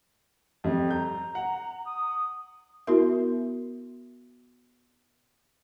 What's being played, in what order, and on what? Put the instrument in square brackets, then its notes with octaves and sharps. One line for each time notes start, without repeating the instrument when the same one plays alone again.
[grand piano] F2 G3
[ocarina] A#5 [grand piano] G6
[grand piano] F#5
[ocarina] D#6
[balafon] B3 E4 F#4 A#4 E5